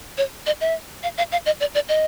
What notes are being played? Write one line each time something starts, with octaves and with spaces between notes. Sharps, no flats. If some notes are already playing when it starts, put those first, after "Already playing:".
C#5
D#5
E5
F5
F5
F5
D#5
D5
D5
D#5